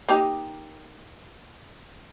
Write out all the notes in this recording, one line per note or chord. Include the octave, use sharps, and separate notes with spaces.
A#3 D#4 G4